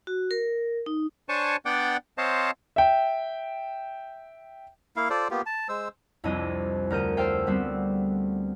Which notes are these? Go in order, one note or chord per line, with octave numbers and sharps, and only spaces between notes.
F#4
A#4
D#4
D4 C5 C#5 G#5 A5 C#6
B3 D4 D5 F#5 G5 D6
C4 C5 C#5 D#5 F5 A5
E5 G5
A#3 E4 F5
F4 A4 C5 D5
A#3 B3 F4 G4
A5
G#3 C5 E6
C2 F2 D4 E4 D#5 D#7
D2 A#4 G6 D#7
A4 C5 F5 G5
G3 A3 B3 C4